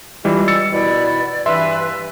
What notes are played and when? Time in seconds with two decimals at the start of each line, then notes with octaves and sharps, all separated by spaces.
0.25 E3 G3 G#3 D4 F4
0.48 E6 A6 C#7
0.73 B2 D#3 E4 D5
1.46 G2 E3 B4 E5 C6